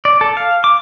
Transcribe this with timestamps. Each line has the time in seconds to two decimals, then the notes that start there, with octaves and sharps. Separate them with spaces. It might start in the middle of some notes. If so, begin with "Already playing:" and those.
0.05 D5
0.21 A4
0.37 F5
0.64 D6